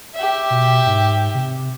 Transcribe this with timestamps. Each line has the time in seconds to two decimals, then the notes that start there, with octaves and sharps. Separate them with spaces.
0.15 G4 E5
0.50 B2
0.86 G#2
1.34 C3